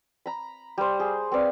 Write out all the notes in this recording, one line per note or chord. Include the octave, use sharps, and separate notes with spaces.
A#5 B5
G3 C5
G#4
C4 B4 D5 F5